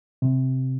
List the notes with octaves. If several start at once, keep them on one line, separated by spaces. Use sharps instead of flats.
C3